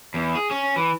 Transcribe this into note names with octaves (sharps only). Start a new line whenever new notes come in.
E2
G#4
C#4
E3